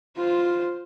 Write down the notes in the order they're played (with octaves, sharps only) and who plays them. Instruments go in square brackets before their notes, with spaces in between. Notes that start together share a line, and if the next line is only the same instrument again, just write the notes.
[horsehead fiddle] F4 C5